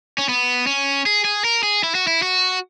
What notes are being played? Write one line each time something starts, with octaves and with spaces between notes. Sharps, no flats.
C#4
B3
C#4
G#4
G#4
A#4
G#4
E4
F#4
E4
F#4